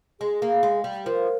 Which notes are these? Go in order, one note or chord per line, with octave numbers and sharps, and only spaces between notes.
G#3 G#4
A#3
G#3
G3
F3 A#4